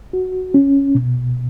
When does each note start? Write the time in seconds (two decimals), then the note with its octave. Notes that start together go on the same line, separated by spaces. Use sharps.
0.13 F#4
0.54 C#4
0.95 B2